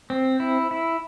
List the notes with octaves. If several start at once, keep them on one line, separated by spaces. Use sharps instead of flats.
C4
E4
E4